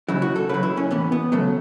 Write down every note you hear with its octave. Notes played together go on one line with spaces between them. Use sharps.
C#3 F#3 E4
F#4
A4
C#3 F#3 B4
E4
C#4
A2 E3 B3
B3
C#3 F#3 A3